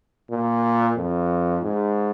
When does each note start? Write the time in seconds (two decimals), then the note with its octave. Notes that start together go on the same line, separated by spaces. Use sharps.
0.30 A#2
0.97 F2
1.63 G#2